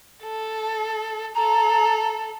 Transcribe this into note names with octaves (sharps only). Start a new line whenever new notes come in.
A4
A4 A#5